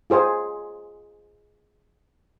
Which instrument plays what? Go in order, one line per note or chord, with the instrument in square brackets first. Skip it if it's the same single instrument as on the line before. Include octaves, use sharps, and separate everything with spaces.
[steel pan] F4 G#4 C5 G#5